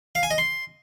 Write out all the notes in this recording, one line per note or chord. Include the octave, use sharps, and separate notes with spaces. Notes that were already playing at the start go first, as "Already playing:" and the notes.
F5
G#5
D#5
C6